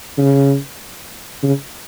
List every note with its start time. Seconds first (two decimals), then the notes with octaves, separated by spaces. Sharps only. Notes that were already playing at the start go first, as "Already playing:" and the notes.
0.18 C#3
1.43 C#3